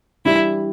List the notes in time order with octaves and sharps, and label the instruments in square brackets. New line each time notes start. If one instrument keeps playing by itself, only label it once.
[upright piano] E3 G3 D4 [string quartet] E4